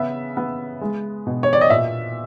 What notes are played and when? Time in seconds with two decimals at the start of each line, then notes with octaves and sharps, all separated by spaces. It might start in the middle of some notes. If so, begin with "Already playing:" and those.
Already playing: C#3 B3 E5
0.37 B3
0.81 G#3
1.27 B2
1.43 C#5
1.53 D5
1.61 D#5
1.70 A#2 E5